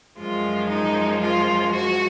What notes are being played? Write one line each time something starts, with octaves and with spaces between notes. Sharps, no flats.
F#2 F3 G#3 F4
D#4
F4
F#4